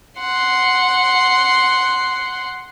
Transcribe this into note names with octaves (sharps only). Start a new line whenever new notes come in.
F#5 C6